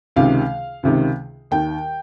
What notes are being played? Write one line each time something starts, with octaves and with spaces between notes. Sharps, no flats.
C#2 C3 D#3 F5
C#2 C3 D#3
D#2 D#3 G5